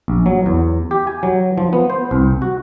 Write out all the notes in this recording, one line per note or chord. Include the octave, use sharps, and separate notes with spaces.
A#1
F#3
E2
G4
G#5
F#3
F3
B3
C5
C2
F#4